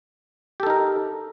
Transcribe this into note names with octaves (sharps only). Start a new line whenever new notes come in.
D#4 G4 A4 A#4